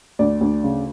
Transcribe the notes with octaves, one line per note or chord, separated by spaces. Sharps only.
D2 D5
D2
C#3